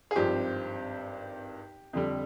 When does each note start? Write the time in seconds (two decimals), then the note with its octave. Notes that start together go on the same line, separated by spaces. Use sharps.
0.11 G#4
0.16 G#1 G2 F3 C4 G4
1.93 F2 D3 G3